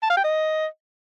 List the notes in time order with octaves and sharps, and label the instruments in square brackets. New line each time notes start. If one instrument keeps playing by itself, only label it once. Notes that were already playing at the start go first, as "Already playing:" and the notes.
[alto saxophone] A5
F5
G5
D#5